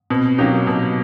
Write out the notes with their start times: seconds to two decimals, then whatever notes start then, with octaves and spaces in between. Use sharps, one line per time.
0.10 B2 C4
0.38 F#3 A#3 C#4 D#4 G4
0.67 B2